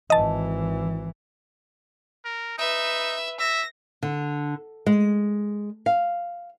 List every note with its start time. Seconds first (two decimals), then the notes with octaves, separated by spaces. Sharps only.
0.10 G#1 E3 D#5 A5
2.25 A#4
2.58 D#4 B4 E5
3.39 E5 A#6
4.03 D3
4.86 G#3
5.86 F5